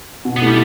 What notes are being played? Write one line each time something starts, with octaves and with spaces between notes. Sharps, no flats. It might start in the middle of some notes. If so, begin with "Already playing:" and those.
B2
A3 B3 E4 G4
G3